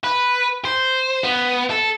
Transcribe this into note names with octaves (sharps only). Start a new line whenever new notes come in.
B4
C5
B3
A4